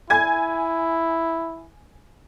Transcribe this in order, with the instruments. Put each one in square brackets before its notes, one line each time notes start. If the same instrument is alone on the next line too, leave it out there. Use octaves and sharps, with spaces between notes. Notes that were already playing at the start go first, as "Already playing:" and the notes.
[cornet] E4 [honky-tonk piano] G#5 G#6